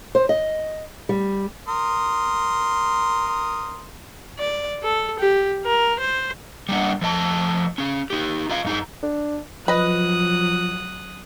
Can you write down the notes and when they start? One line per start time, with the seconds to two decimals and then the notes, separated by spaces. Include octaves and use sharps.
0.15 C5
0.29 D#5
1.09 G3
1.68 A#4 C6 D#6
4.39 D5
4.83 A4
5.19 G4
5.65 A#4
6.00 C5
6.69 G3 A#3 D4 F#5
7.02 F3 A3 D#5 A5
7.78 C#4 G#4
8.10 D#4 G4
8.49 F4 D#5 F5
8.65 F#2 D#4 G#4
9.03 D4
9.68 F3 F#3 B4 D#5 D#6 F#6